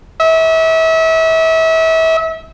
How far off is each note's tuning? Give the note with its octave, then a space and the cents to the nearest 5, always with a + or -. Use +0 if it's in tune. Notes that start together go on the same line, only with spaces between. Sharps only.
E5 -35